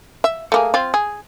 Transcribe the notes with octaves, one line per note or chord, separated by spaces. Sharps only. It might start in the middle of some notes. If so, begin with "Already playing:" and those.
E5
A3 A#3 G#4
C4 F4
G#4